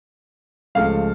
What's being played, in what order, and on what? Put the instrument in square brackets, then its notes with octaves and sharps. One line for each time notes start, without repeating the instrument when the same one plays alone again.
[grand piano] C#2 C#3 F3 A3 F5